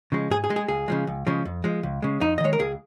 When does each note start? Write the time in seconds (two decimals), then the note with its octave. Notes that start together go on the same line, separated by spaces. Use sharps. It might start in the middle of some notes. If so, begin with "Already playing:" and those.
0.12 C#3 F3 G#3
0.30 G#2 G#4
0.44 G#4
0.50 G#3
0.56 G#4
0.68 C#2 G#4
0.88 C#3 F3 G#3
1.07 C#2
1.27 C#3 F3 G#3
1.45 F2
1.64 F3 G#3
1.83 C#2
2.02 C#3 G#3
2.21 F2 D#4
2.38 D#5
2.40 D#3 G#3 C#5
2.53 A#4
2.59 C#2 G#4